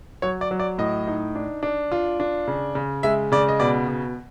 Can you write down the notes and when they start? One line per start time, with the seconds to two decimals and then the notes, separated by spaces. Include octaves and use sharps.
0.22 F#3 C#5
0.41 D5
0.51 F#3
0.60 D5
0.78 A2 D#5
1.07 D#4
1.35 D4
1.63 D4
1.92 F4
2.20 D4
2.48 C#3
2.75 C#3
3.03 G#3 E5
3.32 C#3 D5
3.48 D#5
3.60 B2 D5
3.88 B2